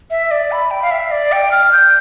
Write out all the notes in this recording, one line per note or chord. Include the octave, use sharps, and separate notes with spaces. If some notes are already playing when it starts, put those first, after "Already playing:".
E5
D5
B5
G5
F5
E5
D5
G5
F6
G6